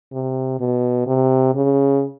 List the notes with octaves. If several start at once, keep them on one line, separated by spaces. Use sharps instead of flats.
C3
B2
C3
C#3